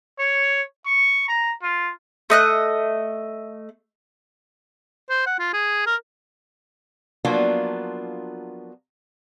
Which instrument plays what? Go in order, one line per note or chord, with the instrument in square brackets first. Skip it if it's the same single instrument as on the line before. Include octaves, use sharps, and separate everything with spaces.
[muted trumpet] C#5
C#6
A#5
F4
[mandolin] A3 D#5 F#6
[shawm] C5
F#5
F4
G#4
A#4
[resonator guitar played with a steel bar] F3 F#3 A#3 B3 D4 F4